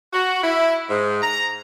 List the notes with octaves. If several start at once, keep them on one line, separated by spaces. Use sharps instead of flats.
F#4
E4
G#2
A#5